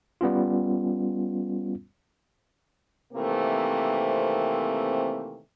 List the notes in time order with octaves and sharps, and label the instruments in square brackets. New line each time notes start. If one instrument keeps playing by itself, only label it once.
[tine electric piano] G3 B3 C#4 F4
[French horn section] C3 D#3 E3 A3 A#3 C4